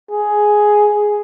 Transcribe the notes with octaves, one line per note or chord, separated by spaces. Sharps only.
G#4